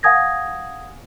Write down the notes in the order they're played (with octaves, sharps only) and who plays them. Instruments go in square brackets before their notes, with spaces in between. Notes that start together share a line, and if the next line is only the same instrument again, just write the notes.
[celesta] F5 F#5 G#5 D#6 G#6 A#6